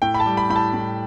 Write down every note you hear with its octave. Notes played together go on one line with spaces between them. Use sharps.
A2 G5
B5
A5
G3
B5
A2 B5
A5
A2